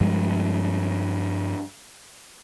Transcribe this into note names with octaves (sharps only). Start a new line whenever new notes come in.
G2 F3 G#3